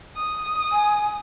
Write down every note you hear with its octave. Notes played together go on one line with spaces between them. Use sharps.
D#6
G#5